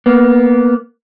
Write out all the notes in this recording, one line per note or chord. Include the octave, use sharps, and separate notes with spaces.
A#3 B3